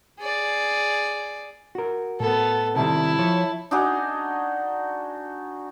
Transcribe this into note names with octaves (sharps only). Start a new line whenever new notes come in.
G#4 D5
F#4 A#4
A2 B3 A4
C3 D#3 G3 E4 A5
F3 C#5
D4 D#4 F#4 G#4